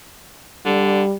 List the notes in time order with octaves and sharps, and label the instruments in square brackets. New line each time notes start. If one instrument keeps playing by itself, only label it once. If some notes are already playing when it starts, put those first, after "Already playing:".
[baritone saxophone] D3 [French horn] G3